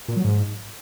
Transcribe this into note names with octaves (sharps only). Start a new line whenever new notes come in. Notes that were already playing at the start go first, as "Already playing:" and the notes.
A#2
F#3
G#2